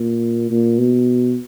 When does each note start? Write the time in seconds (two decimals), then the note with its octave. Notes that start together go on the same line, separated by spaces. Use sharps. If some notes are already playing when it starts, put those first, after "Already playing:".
Already playing: A#2
0.50 A#2
0.78 B2